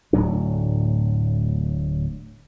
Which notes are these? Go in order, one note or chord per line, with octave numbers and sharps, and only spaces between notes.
D1 A2 F#3 D4